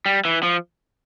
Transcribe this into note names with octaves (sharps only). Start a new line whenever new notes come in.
G3
E3
F3